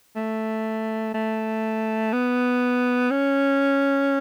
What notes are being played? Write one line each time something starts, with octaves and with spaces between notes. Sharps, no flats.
A3
A3
B3
C#4